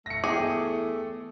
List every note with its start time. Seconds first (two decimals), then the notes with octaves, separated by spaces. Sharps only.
0.06 A3 A#6 C#7
0.24 E2 G#4 G5 D6